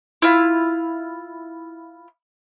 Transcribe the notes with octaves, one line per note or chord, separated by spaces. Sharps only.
E4 F4